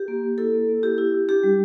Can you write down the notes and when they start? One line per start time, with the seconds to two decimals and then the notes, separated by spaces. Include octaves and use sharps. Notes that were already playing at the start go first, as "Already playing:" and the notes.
Already playing: G4
0.08 A#3
0.23 A#3
0.38 E4 A4
0.54 A#3
0.69 A#3
0.83 E4 G4
0.98 E4
1.14 E4
1.29 D4 G4
1.43 G3